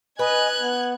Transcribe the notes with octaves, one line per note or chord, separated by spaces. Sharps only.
B4 D#5 G#5 F#6 G#6
B3